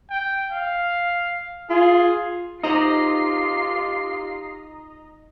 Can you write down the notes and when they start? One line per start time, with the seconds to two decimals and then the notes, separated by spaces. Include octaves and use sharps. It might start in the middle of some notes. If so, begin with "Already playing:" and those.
0.10 G5
0.52 F5
1.70 F4 G#4
2.63 D#4 F4 G4 C5 D#5 A#5 C7